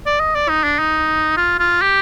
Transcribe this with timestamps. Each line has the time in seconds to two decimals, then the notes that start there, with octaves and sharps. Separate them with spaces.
0.06 D5
0.20 D#5
0.35 D5
0.49 D#4
0.64 D4
0.79 D#4
1.37 F4
1.59 F4
1.82 G4